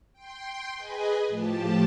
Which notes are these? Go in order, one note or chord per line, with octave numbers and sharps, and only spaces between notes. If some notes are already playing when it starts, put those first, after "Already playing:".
G5 C6
G#4 B4 D#5 G#5
A2 F3 G4 A5